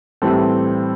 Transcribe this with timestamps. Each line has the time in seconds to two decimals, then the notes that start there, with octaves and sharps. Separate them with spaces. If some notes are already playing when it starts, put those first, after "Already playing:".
0.22 A2 E3 G3 C4 A4